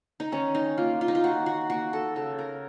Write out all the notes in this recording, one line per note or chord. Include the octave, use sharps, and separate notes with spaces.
D#4
D#3 C#4
D#4
A#3 F4
F4
D#4
F4
D#3 F#4
F#4
A#3 F#4
A4
C#3 A4
A#4